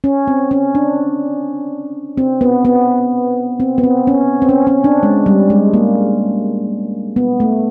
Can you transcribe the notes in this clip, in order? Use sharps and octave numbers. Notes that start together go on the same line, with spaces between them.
C#4
C4
C#4
D4
C4
B3
B3
C4
B3
C4
C#4
C4
C#4
C#4
D4
G#3
G3
G#3
A#3
B3
A3